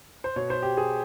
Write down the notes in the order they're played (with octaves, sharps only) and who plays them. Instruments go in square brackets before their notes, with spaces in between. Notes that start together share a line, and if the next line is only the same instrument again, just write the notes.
[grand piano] C5
B2 C#5
C5
G4
G#4